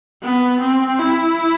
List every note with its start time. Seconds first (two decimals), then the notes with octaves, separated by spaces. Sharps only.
0.22 B3
0.61 C4
0.99 E4